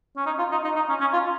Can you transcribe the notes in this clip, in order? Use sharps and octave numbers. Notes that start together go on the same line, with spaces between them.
C#4
D#4
F4
D#4
D#4
D#4
C#4
C#4
F4